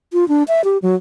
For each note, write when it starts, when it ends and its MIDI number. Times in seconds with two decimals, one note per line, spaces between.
0.13 0.28 65
0.29 0.43 62
0.48 0.64 76
0.64 0.78 67
0.82 0.95 54